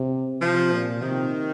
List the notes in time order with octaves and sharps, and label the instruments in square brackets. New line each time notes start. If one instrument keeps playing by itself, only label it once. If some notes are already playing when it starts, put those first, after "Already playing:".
Already playing: [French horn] C3
[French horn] C3 [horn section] F3
[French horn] A#2
[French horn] C3 [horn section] D#3